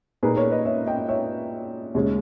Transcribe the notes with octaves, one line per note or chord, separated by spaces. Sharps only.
A#2 A#3 D#4 G#4 B4
A#4 C#5
B4 D#5
C#5 E5
D#5 G5
C#5 E5
D#2 C#3 G#3 C#4